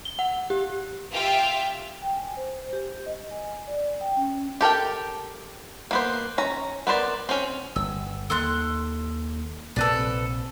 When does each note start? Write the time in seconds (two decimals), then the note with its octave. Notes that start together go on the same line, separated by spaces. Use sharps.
0.05 G7
0.19 F#5
0.50 G4
1.12 F4 G4 E5 F5 G5
2.02 G5
2.17 G#5
2.37 C5
2.59 C5
2.73 G4
3.06 D#5
3.31 G#5
3.68 D5
4.01 G5
4.17 C#4
4.61 G4 A4 A#4 G5
5.91 A#3 B3 C5
6.38 C#4 A#5
6.87 B3 A#4 C5 D5
7.29 C4 C#4
7.76 G1 E6
8.30 D#2 A4 C6 F#6
9.76 A#1 C3 C4 A4 B4 D5